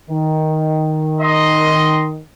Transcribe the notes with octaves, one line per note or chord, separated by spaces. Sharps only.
D#3
D#5 C6